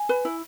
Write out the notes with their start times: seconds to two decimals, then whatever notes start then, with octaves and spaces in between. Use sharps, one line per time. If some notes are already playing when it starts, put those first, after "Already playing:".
Already playing: G#5
0.09 B4
0.25 E4